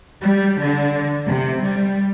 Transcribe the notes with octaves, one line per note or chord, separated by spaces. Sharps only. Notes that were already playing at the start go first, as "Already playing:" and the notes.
G3
D3
C3
G3